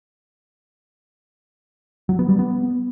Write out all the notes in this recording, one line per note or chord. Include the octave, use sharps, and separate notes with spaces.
F#3
B3
G3
B3